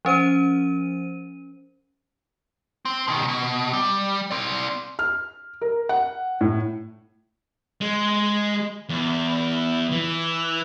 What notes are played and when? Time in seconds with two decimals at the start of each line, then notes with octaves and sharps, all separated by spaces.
0.05 F3 C#4 C5 D#7
2.85 C4
3.08 B2 D#3
3.28 B2
3.73 G3
4.31 C4 D5
4.99 F6
5.61 A#4
5.89 F#5
6.41 A2
7.81 G#3
8.89 E2
9.92 E3